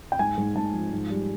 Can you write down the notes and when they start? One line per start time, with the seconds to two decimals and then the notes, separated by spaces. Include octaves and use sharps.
0.12 G5
0.19 G#2 G#5
0.38 G#2
0.55 G#2 A5
0.74 F3
0.93 G#2
1.10 G3